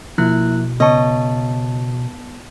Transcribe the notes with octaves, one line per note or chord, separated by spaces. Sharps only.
B2 F3 A#3 E4 F#6
C#3 B3 C#5 D#5 A5 C#6